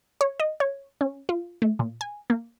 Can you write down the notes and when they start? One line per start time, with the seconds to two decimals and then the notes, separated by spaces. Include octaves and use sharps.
0.21 C#5
0.40 D#5
0.60 C#5
1.01 C#4
1.29 F4
1.62 A3
1.79 A#2
2.01 G#5
2.30 A#3